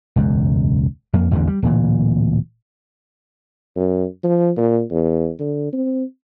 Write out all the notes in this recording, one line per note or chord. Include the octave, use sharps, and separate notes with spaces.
E1 C#2 F#2
F2 A#3
A1 E2 G2 D3
G3
D1 A#2 E3
F#2
F3
A#2
E2
D3
C4